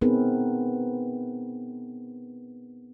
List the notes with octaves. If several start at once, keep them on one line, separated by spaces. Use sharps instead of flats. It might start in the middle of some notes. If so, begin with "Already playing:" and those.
B3 C4 D#4 G#4 A#4 B4